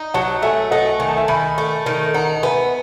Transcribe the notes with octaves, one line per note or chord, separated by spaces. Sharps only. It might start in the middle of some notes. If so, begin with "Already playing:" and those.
Already playing: D#4
F#3 F#5 A5
A3 E5 G#5
A3 D#5 F#5
D#3 G#5
A5
E5 G#5
D#3 G#5 B5
A3
D#3
D#4 F#5 A5
B3 E5 G#5